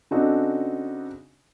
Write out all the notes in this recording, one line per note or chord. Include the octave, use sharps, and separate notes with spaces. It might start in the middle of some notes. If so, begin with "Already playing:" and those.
C#3 C4 D4 D#4 F#4 A4